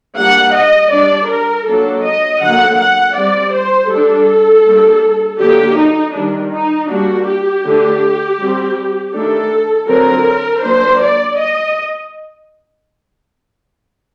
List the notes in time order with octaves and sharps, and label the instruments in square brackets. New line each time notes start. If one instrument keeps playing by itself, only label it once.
[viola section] G3 A#3 D4 F#5
D#5
G3 D4 D5
A#4
F#3 A#3 D4 A4
D#5
D3 F#3 A#3 F#5
F#5
G3 C4 D5
C5
G3 D4 A4
G3 A#3 D4
D3 F#3 A#3 G4
D#4
D#3 G3 D4
D#4
G3 A#3 D4 F#4
G4
D3 A3 D4
G3 C4
D#3 A3 D4 A4
D3 F#3 C4 A#4
F#3 A#3 D4 C5
D5
D#5